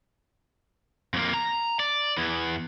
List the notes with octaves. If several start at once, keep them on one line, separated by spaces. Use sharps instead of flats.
F2 A#3
A#5
D5
E2 E3